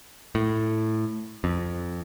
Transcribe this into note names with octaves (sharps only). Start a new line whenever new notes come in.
A2
F2